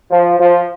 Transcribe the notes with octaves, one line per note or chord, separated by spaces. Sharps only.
F3
F3